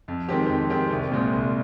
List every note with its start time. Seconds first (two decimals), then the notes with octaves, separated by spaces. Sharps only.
0.08 F2
0.28 D#3 G#3 C4 G4
0.50 F2
0.70 D#3 G#3 C4 G4
0.91 C2
1.12 A#2 G#3 C4
1.33 C2